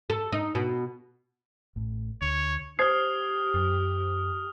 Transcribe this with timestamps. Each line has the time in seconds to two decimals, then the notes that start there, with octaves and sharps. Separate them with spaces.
0.10 A4
0.32 D#4
0.55 B2
1.76 A1 A2
2.21 D2 C#5
2.79 G4 C5 D#6 F6 G#6 C7
3.54 F#2